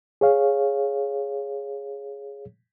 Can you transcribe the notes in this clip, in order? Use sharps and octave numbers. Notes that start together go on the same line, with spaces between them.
G#4 C#5 F5